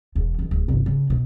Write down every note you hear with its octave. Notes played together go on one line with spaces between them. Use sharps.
E1 E2
D3 D#3
D1
G1 C3
C#3
B2